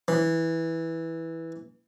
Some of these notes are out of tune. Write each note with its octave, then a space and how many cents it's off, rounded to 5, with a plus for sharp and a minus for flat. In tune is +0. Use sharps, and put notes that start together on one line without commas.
E3 -10